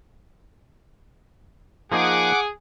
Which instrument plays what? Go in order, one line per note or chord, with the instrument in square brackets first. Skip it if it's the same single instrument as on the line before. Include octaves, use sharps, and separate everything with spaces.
[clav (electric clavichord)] F3 A#3 D#4 [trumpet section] G#4 [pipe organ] F#5 D6